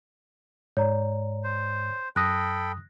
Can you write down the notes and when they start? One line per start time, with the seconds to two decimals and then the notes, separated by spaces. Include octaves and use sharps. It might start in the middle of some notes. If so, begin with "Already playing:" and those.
0.77 G#2 C#5 D5 A#5
1.44 C5
2.16 F#2 A4 G5 B5 D#6 F#6 A#6